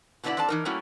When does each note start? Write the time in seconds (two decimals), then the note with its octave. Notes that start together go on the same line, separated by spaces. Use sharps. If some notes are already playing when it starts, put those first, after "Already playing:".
0.24 B2 D3 B3 D#4 E4 D5
0.37 C4 D4 A4 D5 A5
0.49 E3 D#4 A#4
0.65 G3 A3 A#3 C#4 E4 F#4